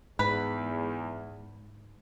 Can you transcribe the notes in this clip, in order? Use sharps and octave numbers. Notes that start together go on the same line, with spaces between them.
E2 G#2 B4